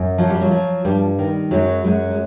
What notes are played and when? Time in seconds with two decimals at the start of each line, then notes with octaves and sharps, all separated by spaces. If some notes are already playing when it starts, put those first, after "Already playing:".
Already playing: F#2
0.18 F3 F#3
0.30 G3
0.41 F#3
0.51 F3
0.85 G2 G3
1.19 D#3
1.51 F#2 F#3 G#3
1.84 F#2 F#3 G#3
2.10 G#3